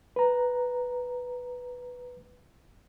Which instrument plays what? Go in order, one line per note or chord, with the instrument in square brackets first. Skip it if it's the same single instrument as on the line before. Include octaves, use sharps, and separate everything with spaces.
[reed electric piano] B4 A#5